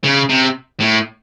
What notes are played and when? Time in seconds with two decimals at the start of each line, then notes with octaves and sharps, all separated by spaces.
0.04 C#3
0.30 C3
0.80 A2